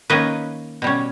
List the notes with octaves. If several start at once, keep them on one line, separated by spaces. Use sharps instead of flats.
D#3 A#3 C#4 B4 D#5
B2 G3 C#4